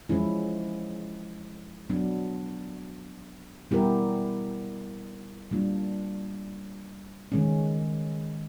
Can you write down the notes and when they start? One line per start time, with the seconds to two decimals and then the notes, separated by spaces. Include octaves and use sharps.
0.09 F3 G#3 C#4 E4
1.90 F#3 B3 D4
3.71 G3 B3 E4 G4 A#4
5.51 G3 A#3 D4 F4
7.32 D#3 G#3 C#4